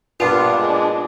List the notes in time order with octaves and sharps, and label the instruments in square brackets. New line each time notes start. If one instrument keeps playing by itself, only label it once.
[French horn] G2 [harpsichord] A#2 B3 [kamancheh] D4 [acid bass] F4
[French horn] G#3